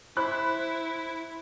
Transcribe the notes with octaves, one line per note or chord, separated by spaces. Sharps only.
E4 C5 B5 F#6